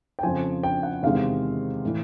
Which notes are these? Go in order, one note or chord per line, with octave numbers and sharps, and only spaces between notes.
G5
F2 C#3 F3 G#5
G5
F#5
E2 C3 D#3 G#3 F5
A2 E3